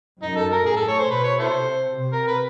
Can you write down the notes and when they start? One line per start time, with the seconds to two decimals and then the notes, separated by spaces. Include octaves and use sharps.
0.22 F#2 D#4
0.37 A4
0.52 A#4
0.66 A2 G#4
0.77 A4
0.88 C#5
0.99 C5
1.11 B2 B4
1.24 C#5
1.39 E4 A4 C5
1.53 C3
1.98 C3
2.13 A#4
2.27 B4